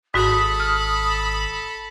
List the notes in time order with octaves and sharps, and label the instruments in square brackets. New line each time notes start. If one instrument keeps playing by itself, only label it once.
[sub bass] G#1 [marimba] G#2 F#4 [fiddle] A4 B5 [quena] D#6
[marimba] F6